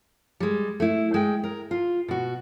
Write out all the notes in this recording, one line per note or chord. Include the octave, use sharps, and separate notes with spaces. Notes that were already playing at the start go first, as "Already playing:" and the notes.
G3 G#3
A3 E4
G#3 G5
A#4
F4
B2 F#4